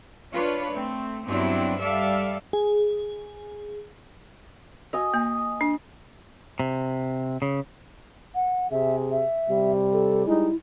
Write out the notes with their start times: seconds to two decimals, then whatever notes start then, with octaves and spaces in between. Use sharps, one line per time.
0.32 D4 F4 B4 C#5
0.73 A3 C4
1.27 G2 F#3 B3 C4 D4 E4
1.80 G3 A4 D5 E5 F5
2.53 G#4
4.93 F#4 D#5 G#5
5.14 A#3
5.61 D4
6.60 C3
7.42 C#3
8.35 F#5
8.71 C3 G#4 E5
9.11 E5
9.48 C3 G3
9.93 A4
10.26 G3 G#3 D#4 E4